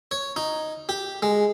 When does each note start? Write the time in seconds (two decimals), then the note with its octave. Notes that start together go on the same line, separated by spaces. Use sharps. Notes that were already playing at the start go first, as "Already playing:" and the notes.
0.11 C#5
0.36 D#4
0.89 G4
1.22 G#3